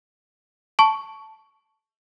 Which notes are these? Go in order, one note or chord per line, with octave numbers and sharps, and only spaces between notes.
A5 C#6